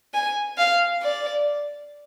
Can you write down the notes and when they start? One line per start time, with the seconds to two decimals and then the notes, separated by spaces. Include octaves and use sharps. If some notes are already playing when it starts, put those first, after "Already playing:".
0.14 G#5
0.58 F5
1.02 D5